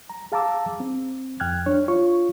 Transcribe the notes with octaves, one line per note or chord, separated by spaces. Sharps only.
A#5
G#4 F5 A5 A#5 D6 E6
C4
F2 G5 F6 F#6 G#6
D4 C#5
F4 C#5 C#6